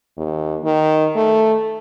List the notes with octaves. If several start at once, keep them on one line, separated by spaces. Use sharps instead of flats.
D#2
D#3
A3